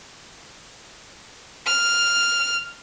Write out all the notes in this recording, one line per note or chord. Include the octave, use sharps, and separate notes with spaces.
F6